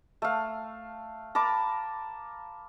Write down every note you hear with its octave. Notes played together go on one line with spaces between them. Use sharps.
A3 F5
A#4 A5 B5 D6